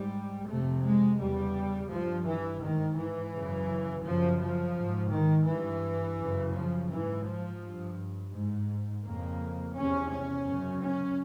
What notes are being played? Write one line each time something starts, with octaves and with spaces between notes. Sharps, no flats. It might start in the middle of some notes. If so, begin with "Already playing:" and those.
Already playing: G#2 G3
F2 C3 A3
G#3
E2 C#3 G3
G2 F3
E3
G#2 D#3
E3
F#2 C#3
F#2 C#3 F3
F3
G#2
D#3
G2 E3
F#2 C#3
F3
G#2 E3
F3
G2
G#2
F2 C#3 A#3
E2 C3 C#4
C#4
F#2 C#3
C#4